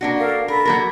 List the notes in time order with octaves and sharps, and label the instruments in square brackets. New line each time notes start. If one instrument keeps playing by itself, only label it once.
[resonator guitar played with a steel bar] A#3 D4 F#4
[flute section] A4 A#4 F5
[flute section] A4 B5 [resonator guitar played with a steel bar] A#4
[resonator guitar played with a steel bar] F#3 A#3 A#4